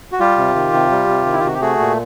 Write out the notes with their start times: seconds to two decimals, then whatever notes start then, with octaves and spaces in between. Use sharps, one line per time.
0.12 F#4
0.20 G3 F4 G4
0.38 C3
0.55 D#3
0.73 C3
0.91 G3
1.08 C3
1.26 D#3
1.32 E4
1.40 F4
1.43 C3 F#4
1.54 G4
1.61 A3 F#4 G#4
1.79 A#2